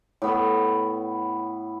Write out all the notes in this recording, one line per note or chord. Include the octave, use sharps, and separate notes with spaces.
A2 B3